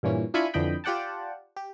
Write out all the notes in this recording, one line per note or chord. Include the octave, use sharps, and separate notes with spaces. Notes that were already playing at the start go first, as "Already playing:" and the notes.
G2 A#2 E3 C#4
D4 E4 F4 G#5 B5 C#6
F2 D3 E3 D#5 G5 B5
F4 G4 D5 F#5 G5 A5
G4